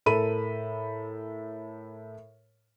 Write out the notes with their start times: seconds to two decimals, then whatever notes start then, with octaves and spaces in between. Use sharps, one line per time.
0.06 A2 A4 A#4 B5 D#7